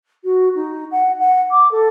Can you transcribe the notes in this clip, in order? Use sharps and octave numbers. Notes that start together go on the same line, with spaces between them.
F#4
D#4
F#5
F#5
D6
A4